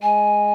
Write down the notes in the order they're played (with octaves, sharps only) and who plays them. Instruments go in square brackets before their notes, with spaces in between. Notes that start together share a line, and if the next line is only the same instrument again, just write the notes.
[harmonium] G#3 [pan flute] G#5